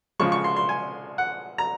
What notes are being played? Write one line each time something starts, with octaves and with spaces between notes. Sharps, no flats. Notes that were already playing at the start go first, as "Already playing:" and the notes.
C#3 F3 G#3 C#6
C#6
C6
C6
G#5
F#5
A#5